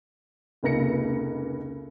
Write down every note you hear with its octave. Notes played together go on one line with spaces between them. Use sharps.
F1 C#2 A#3 A#6 C#7